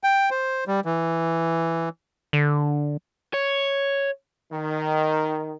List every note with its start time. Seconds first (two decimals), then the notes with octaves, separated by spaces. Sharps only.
0.04 G5
0.31 C5
0.68 G3
0.85 E3
2.33 D3
3.34 C#5
4.52 D#3